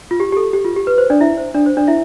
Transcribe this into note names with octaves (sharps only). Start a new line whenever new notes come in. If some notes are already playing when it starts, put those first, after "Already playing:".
F4
G4
G4
A4
G4
F4
G4
B4
C5
D4 D5
E4 E5
C5
D4 D5
C5
D4 D5
E4 E5